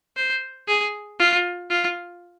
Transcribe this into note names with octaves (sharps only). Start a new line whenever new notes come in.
C5
G#4
F4
F4